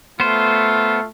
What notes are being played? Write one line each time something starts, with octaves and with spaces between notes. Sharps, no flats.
A3 B3 F4 C5